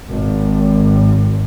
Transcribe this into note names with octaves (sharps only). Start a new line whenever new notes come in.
G#1